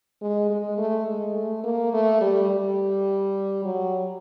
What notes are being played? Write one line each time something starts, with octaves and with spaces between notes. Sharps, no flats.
G#3
G#3
A3
G#3
A3
A#3
A3
G3
G3
F#3